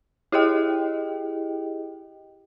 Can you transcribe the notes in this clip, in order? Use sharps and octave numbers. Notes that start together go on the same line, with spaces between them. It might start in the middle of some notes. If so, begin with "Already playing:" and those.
E4 G4 G#4 D#5 G5